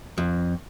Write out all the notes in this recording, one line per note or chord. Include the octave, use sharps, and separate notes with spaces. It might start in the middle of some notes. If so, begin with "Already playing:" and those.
F2